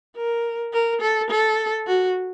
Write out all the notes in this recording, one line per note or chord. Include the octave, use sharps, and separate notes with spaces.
A#4
A#4
A4
A4
F#4